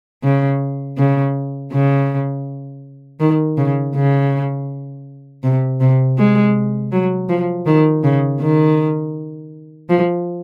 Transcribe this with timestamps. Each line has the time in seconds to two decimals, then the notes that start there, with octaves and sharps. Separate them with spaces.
0.23 C#3
0.98 C#3
1.72 C#3
3.20 D#3
3.57 C#3
3.95 C#3
5.43 C3
5.80 C3
6.17 G#3
6.92 F#3
7.29 F3
7.66 D#3
8.03 C#3
8.40 D#3
9.89 F3